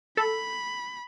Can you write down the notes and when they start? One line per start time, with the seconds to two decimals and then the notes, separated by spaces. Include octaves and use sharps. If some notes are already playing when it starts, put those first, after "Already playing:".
0.17 A4 B5